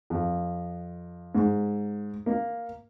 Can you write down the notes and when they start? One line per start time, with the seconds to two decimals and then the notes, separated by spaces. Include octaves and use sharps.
0.10 F2
1.35 G#2
2.26 A#3